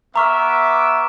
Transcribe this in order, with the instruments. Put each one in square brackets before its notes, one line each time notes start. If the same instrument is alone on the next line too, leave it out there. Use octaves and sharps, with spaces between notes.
[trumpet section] B3 E5 D6 [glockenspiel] A#5 C#6 F6